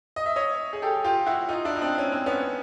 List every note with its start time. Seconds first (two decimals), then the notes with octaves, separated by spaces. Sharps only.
0.16 D#5
0.26 E5
0.36 C#5 D#5
0.73 G#4
0.82 G4 A4
1.04 F4 G4
1.26 E4 F#4
1.49 D#4 F4
1.65 D4 E4
1.76 D#4
1.81 C4 D4
1.98 C#4
2.12 C4
2.26 B3 C#4